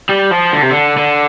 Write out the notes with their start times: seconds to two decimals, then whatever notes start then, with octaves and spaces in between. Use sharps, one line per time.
0.09 G3
0.31 F3
0.53 D3
0.62 C3
0.71 D3
0.97 D3